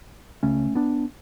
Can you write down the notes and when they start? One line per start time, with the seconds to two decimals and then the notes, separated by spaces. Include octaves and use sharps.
0.43 C#2 C#3 A3 C#4
0.75 B3 D4